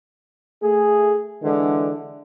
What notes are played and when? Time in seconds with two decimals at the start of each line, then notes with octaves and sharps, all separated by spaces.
0.63 A3 G#4
1.43 D3 E3 G#3 D4